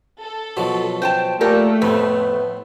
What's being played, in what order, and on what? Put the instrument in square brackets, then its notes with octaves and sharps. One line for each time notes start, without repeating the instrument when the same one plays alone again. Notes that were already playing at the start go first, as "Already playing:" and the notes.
[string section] A4
[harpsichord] B2 F3 F#3
[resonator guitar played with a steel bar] C5 G5 A5
[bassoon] A#2 [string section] A3 [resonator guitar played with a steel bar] G4 A4 A#4
[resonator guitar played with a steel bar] F2 [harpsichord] A2 C4 [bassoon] B3